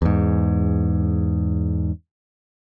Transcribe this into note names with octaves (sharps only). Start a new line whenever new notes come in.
E2 G#2